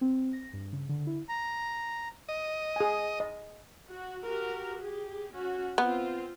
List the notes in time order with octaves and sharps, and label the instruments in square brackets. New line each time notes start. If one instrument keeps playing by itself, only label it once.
[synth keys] C4
A#6
G2
C#3
D3
E4
[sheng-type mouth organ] A#5
[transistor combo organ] D#5
[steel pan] G#4 G#5
D#5
[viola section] F#4
F#4 G4 A#4
G4 G#4
C#4 F#4
[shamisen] B3 [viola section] C4 F4 C5